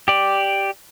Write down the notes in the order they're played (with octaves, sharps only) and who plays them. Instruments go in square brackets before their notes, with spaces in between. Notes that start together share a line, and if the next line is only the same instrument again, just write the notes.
[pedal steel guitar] G4 D5